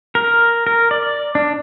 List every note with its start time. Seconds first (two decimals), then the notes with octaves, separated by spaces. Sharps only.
0.15 A#4
0.67 A#4
0.91 D5
1.35 D4